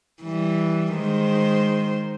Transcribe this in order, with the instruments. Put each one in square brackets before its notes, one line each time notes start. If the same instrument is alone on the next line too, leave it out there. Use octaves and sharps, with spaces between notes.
[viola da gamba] E3 G3
D#3 G#3 C5